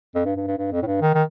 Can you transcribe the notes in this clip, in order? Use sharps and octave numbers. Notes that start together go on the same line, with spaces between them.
F2
G2
G2
G2
G2
F2
A2
G2
D#3
D#3